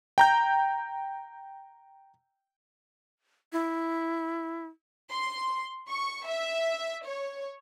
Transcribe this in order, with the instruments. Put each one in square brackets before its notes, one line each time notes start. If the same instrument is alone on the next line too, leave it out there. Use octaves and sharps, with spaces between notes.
[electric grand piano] G5 A#5 G6
[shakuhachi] E4
[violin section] C6
C#6
E5
C#5